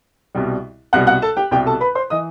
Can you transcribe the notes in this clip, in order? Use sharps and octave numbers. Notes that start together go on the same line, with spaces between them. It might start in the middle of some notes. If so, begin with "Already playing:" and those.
C2 B2 G3
C2 B2 G3 F#5 F#6
F#5 F#6
A4 A5
G4 G5
C2 B2 G3 G4 G5
A4 A5
B4 B5
C5 C6
E3 D#5 D#6